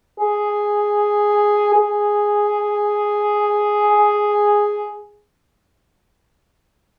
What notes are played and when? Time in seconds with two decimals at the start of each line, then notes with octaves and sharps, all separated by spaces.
0.19 G#4
1.75 G#4